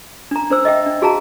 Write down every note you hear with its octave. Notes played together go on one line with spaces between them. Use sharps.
D4 A#5
D4 C5 E6
D#5 E5 G5
D4
F#4 G#4 F5 A5 A#5